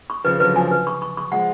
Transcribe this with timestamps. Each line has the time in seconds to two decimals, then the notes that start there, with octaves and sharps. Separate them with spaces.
0.10 C#6
0.25 C#3 F3 B4
0.40 D3 F#3 B4
0.55 C#3 F3 G#5
0.71 B4
0.87 C#6
1.02 C#6
1.17 C#6
1.32 F3 G#3 F#5